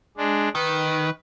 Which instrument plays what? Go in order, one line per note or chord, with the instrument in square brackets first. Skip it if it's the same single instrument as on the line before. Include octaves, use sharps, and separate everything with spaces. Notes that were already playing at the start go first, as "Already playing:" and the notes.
[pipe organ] G#3 D4
[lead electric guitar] D#3 [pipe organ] B4